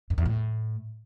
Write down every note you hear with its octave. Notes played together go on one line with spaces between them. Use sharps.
F#2
E2
A2